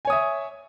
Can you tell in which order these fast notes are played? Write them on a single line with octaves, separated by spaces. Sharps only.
G#5 C#5 D#6 E5